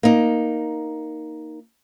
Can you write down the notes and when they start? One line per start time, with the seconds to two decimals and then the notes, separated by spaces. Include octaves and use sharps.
0.03 A#3 D#4